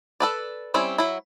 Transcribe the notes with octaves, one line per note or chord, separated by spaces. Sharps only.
A4 B4 D5
G3 C4 C#4 E4
F#3 E4